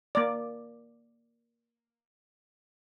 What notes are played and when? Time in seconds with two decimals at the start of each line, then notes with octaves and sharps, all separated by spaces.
0.15 A#3 D5